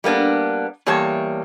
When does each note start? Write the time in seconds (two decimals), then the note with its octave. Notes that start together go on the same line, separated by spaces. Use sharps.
0.04 G3 A#3 B3 D4
0.86 E2 G3 A#3 C#5 A5